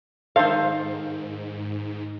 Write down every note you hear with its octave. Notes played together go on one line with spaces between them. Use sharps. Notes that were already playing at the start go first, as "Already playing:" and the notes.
G#2 D#3 A4 C5 F5